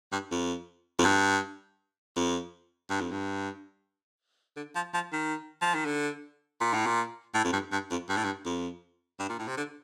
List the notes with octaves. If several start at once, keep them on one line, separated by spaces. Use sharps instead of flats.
G2
F2
F2
G2
F2
G2
F2
G2
D3
F3
F3
D#3
F3
D#3
D3
A#2
A2
A#2
A2
F2
G2
G2
F2
G2
A2
G2
F2
G2
A#2
A2
C3
D3